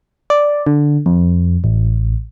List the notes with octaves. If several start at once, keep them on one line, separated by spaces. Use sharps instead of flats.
D5
D3
F2
A1